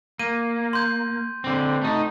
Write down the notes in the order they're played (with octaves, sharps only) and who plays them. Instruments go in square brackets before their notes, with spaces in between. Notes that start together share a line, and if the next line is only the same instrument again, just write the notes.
[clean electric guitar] A#3 [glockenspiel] D#7
[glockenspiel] C6 G6
[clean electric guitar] D3 C4
A3 D#4